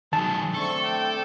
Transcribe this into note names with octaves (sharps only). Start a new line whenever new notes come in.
D#3 F#3 G#4 A5
A3 C4 D4 A4 C#6
G5